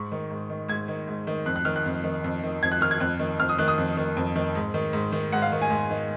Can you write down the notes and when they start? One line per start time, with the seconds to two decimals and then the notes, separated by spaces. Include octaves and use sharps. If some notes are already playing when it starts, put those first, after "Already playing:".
Already playing: G#2 C#6
0.12 D#3
0.31 G#2
0.50 D#3
0.69 G#2 G#6
0.88 D#3
1.08 G#2
1.27 D#3
1.46 F2 F#6
1.56 F#6
1.65 D#3 F6
1.76 F#6
1.86 F2
2.04 D#3
2.24 F2
2.43 D#3
2.63 F2 G#6
2.72 F#6
2.81 D#3 F6
2.91 G#6
3.00 F2 F#6
3.19 D#3
3.39 F2 F6
3.49 D#6
3.58 D#3 F#6
3.68 D#6
3.78 F2
3.97 D#3
4.17 F2
4.36 D#3
4.55 G#2
4.74 D#3
4.93 G#2
5.13 D#3
5.32 G#2 F#5
5.42 F5
5.52 D#3
5.62 G#5
5.70 G#2
5.91 D#3